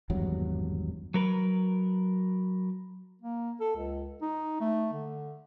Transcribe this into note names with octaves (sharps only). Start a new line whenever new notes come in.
G#1 E2 G2 F#3
F#3 A#4 B4
A#3
A4
C#2
D#4
A3
D3